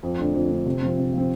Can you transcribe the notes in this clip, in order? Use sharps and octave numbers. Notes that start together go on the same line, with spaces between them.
F2
D3 A3 D4
F2
D3 A3 D4
C3
F3 C4
C3
F3 C4